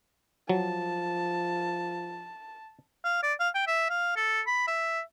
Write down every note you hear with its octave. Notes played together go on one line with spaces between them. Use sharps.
F3 F#3 A5
F5
D5
F5
G5
E5
F5
A4
B5
E5